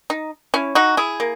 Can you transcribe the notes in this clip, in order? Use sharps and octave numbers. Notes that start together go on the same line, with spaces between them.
D#4
C#4 E4
D#4 F#4
E4 G#4
A#3